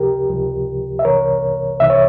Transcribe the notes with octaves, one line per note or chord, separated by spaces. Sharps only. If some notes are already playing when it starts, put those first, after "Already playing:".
Already playing: C#2 C3 F3 G4 A#4
C#2 C3 F3
E5
C2 C3 E3 A#4 C#5
C2 C3 E3 E5
C#5